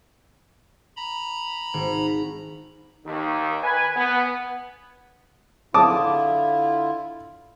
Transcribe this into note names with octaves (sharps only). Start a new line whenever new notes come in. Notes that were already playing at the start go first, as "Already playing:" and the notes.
A#5 B5
G#1
D#2 D#3
B4 G#5
B3
D3 E4 F4 A5 D6 D#6